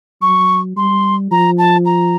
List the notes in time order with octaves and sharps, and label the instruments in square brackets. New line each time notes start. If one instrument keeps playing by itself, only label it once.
[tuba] F#3 [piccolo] C#6
[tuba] G3 [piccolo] C6
[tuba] F3 [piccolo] A#5
[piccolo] A5
A#5